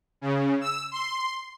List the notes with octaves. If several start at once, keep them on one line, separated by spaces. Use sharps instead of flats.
C#3
E6
C6